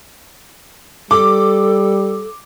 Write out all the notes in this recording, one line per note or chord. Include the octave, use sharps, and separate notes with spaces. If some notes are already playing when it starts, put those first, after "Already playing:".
G3 A4 D6